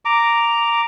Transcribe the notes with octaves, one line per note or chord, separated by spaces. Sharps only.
A#5 D6